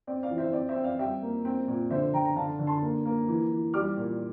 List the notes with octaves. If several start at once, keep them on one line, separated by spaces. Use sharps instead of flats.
C4 D5
D5 F5
E3
C5 E5
C4 D5
C5 E5
C4
D5 F5
G3 E5 G5
A#3
C4
A#2
D3 C5 E5
D3 G5 A#5
A#5
D3 F5 A5
D3
A5 C6
A#3
A#3
E3
E3
G3 D6 F6
A#2